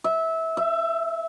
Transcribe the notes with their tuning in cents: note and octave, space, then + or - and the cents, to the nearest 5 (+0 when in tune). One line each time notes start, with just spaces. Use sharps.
E5 -20
E5 +25